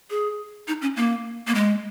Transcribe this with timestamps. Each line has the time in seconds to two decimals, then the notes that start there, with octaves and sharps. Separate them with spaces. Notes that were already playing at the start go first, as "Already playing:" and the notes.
0.10 G#4
0.68 D#4
0.82 C#4
0.97 A#3
1.47 A#3
1.55 G#3